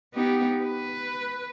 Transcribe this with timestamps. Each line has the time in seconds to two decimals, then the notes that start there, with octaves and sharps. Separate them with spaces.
0.14 B3 D#4 G4
0.64 B4